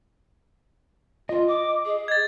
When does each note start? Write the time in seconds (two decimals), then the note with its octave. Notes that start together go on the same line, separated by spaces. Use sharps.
1.29 F4 D#5
1.48 D6
1.85 G#4
2.08 G#6 A6